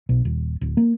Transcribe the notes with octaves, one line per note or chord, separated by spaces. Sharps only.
B1
D#1
D1
A#3